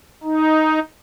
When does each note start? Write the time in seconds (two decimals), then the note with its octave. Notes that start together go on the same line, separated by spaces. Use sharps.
0.23 D#4